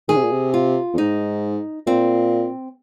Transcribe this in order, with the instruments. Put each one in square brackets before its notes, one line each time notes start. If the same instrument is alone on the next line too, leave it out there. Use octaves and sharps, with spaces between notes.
[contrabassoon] D#3 [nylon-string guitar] G#4
[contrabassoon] C3
A#2
C3
[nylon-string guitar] F4
[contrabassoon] F2
[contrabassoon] G#2 [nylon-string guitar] D#4
[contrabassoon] A#2 [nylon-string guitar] C4